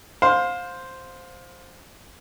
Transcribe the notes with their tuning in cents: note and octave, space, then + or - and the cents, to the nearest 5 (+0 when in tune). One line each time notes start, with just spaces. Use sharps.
C5 +0 F5 +25